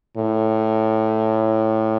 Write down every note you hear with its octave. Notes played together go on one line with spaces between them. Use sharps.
A2